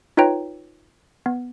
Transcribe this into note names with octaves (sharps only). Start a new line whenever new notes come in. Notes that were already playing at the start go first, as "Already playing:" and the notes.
D#4 F4 B4 C#5 G5 A#5
B3